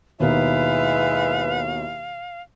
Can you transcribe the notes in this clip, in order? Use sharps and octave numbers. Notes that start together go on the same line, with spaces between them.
D#2 B2 G#3 D#4 E4 B4 F5